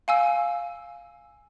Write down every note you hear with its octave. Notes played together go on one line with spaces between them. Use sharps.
F5 G#5 E6